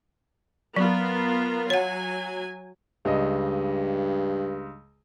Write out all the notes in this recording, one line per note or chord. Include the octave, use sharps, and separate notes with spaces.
F#3 B3 F4 A#4
F#3 C#5 F#5 G#5
C#2 G2 D#5